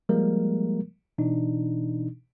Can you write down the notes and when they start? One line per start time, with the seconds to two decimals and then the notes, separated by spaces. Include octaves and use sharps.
0.09 F3 G3 G#3 A#3 A#4
1.18 B2 E3 D4 D#4